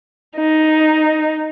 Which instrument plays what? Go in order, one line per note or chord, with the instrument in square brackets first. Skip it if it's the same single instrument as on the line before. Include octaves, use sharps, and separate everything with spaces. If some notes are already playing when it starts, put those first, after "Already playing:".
[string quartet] D#4